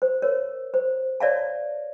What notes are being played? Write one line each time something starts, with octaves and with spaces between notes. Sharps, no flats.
C5
A#4 C#5
C5
C#5 D5 E5 F5 A5